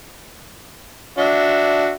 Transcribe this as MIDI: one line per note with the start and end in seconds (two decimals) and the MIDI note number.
1.18 1.92 62
1.18 1.92 66
1.18 1.92 76